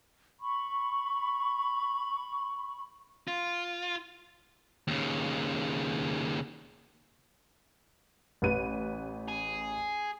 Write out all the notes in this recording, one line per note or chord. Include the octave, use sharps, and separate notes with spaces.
B5 C#6
F4
D#2 C#3
A1 B4 D#7
G#4